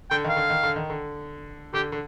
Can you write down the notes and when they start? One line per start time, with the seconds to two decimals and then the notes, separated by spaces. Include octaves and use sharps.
0.10 D3 G5
0.24 D#3 F5
0.36 D3
0.50 D#3
0.63 D3
0.76 D#3
0.90 D3
1.73 D3 G4
1.92 D3